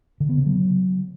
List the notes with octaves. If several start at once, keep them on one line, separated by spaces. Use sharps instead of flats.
D3
B3
C#3
F#3